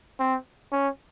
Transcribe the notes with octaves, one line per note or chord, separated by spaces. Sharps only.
C4
C#4